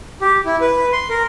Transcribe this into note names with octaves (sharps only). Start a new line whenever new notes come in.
G4
E4
B4
C6
A#4